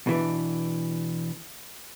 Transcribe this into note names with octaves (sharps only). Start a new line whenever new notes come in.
B2 E3 D4